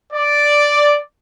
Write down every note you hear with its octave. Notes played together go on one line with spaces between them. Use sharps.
D5